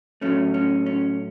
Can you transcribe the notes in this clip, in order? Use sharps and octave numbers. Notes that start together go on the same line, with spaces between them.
A2 F#3 A3 C#4
C#4
C#4